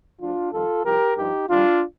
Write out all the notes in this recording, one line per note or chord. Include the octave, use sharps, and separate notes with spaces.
D2 D3 F3 D4 F4
F2 D#3 G3 F4 A4
C2 C3 F3 G4 A#4
G2 F3 D#4 G4
F2 D#3 G3 D4 F4